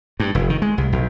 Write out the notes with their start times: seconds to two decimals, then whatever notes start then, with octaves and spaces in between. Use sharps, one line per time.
0.20 G2
0.35 F1
0.50 D#3
0.62 G#3
0.78 C2
0.92 B1